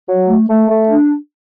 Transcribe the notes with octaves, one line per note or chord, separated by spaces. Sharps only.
F#3
A3
A3
A3
D4